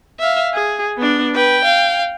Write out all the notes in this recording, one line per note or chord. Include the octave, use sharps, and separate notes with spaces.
E5 F5
G#4
B3 D4
B4 G5
F5